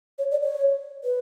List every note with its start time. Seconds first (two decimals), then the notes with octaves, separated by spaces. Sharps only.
0.18 C#5
0.31 D5
0.43 C#5
1.04 B4